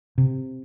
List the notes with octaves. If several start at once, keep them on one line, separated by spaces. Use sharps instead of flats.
C3